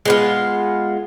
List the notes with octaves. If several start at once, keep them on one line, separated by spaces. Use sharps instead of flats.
G#3 B3 F4